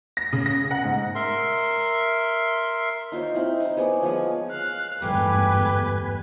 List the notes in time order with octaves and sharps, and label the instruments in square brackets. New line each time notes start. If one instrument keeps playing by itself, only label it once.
[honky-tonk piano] A#6
C#3
A#6
F#5
G#2
[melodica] A#4 E5 C6
[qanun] D#4 F4 C5 C#5
C4 D#4 E4
D#4 C5
B3 G#4 C#5 D5
F3 G#3 B3 C#5
[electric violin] F5 F#6
[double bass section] G1 G#2 [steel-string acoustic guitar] E2 G3 A3 [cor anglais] G4 [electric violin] B4 G#5